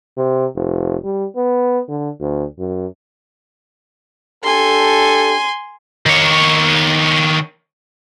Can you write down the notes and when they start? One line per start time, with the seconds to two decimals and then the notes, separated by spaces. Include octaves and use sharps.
0.17 C3
0.55 F1
1.04 G3
1.36 B3
1.88 D3
2.20 D2
2.59 F#2
4.44 D4 G4 A4 G#5 C6
6.06 D#3 C#5